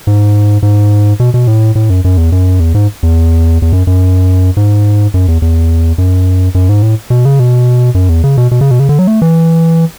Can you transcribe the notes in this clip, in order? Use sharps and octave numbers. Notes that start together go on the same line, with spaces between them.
G#2
G#2
B2
B2
A2
A2
F#2
F#2
E2
F#2
E2
G#2
E2
E2
F#2
F#2
G#2
F#2
E2
E2
F#2
F#2
G#2
A2
B2
C#3
B2
F#2
E2
C#3
B2
B2
C#3
B2
C#3
D3
F#3
A3
E3